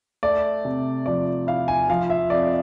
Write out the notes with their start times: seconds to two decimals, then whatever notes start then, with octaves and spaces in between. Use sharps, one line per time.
0.23 A3 D5
0.65 C3
1.06 F3 D5
1.47 E4 F5
1.68 G#5
1.89 F3 F5
2.10 E5
2.30 F2 D5